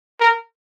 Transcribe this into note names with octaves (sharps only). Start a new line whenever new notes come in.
A#4